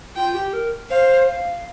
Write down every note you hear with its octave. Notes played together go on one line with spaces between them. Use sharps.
F4 G5
G4
A#4
C5 F5
F5